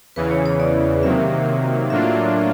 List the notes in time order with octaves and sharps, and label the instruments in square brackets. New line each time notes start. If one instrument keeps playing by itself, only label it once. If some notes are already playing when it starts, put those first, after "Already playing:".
[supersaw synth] E2 C#3 E3 [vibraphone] B4
[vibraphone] C#5
C#5
D5
[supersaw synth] C3 D#3 F#3 A#3 [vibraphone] E5
[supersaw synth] A2 F#3 A#3 D4 F4 [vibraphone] E5